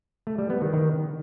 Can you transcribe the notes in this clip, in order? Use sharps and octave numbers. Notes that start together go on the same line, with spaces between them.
A3
G3
B3
D#3
D#3